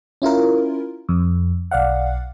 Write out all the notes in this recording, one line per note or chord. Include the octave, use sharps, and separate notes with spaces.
C#4 E4 F4 A#4
F2
B1 D5 F5 F#5